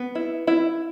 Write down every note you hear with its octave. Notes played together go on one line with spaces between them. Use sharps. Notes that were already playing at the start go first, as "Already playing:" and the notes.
Already playing: B3
E4
E4